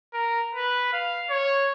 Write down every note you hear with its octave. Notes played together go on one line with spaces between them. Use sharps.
A#4
B4
F5
C#5